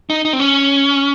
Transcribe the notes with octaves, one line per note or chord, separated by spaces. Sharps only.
D#4
D#4
C4
C#4